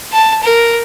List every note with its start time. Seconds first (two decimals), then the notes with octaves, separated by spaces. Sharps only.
0.12 A5
0.43 A#4